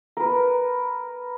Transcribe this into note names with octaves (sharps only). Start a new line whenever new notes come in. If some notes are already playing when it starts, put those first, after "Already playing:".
A#4 B4